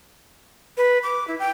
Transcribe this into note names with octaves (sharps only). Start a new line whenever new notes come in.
B4
D6
E4
G5